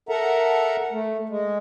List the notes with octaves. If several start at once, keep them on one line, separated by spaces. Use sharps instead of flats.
A4 A#4 E5 F#5 A#5
A3
G#3